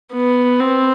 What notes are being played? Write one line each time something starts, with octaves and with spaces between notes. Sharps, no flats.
B3
C4